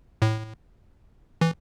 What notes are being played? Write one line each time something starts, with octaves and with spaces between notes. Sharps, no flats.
A2
E3